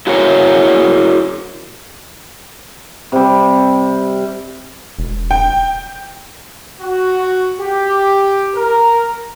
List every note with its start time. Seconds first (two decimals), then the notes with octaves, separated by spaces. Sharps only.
0.07 E4 F#4 G#4 A#4 C#5
3.12 C3 G3
4.99 E1
5.31 G5
6.80 F#4
7.60 G4
8.55 A#4